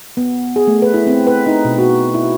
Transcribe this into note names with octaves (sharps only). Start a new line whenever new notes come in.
B3
G#4
A3
B4
E4
C4
B4
D#4
B2
F#4
E4